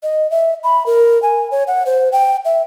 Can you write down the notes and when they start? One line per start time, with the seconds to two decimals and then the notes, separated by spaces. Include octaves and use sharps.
0.03 D#5
0.31 E5
0.64 B5
0.86 A#4
1.22 G#5
1.51 C#5
1.67 F#5
1.86 C5
2.12 G5
2.45 E5